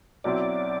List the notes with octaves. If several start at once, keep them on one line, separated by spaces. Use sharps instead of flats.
B1 B2 F#3 C4 E4 D5